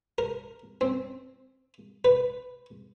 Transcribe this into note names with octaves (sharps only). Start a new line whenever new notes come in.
A#4
C4
B4